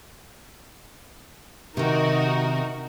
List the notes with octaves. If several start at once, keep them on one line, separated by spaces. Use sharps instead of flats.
C3 D#3 D#4 F#4 A#4